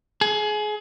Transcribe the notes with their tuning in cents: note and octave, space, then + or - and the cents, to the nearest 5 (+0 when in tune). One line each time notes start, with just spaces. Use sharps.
G#4 +25